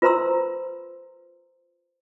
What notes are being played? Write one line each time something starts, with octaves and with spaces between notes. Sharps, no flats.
F4 B4 C5 A#5 C6 E6